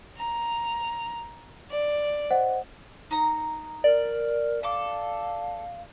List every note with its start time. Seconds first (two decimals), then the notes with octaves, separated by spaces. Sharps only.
0.17 A#5
1.69 D5
2.30 C5 D#5 F#5
3.11 D#4 A#5
3.84 A#4 D5
4.63 A4 F5 D6